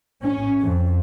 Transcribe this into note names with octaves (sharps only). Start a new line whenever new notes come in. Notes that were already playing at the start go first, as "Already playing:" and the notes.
C#4
F2